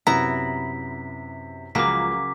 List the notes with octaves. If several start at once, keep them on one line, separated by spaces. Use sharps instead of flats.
F#2 C3 B3 E4 A#5 B6
C#2 C#3 F3 F#3 A#3 D6 B6